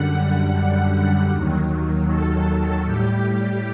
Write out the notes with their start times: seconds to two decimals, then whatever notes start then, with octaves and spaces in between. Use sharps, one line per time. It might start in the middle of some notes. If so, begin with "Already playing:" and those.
Already playing: F#2 D3 G3 F#5
0.14 F#5
1.30 D#2 D#3 F#3
2.07 A4
2.84 A2 G3 G4